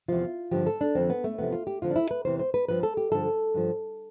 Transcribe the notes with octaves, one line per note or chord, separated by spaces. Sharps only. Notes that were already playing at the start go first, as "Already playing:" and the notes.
E2 C3 F3 F4
G2 D3 F3 G4
A4
D4
F2 D3 F3 C4
B3
A3
E2 C3 F3 B3
F4
G4
F2 D3 F3 F4
D4
E4
B4
E2 C3 E3 C5
C5
B4
G2 F3 B4
A4
G4
G2 D3 F3 A4
G2 F3